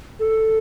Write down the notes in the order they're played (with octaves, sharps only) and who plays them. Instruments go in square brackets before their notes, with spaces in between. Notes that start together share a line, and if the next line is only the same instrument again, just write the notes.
[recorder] A4